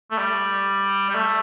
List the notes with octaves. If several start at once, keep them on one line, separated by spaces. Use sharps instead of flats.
A3
G3
G3
A3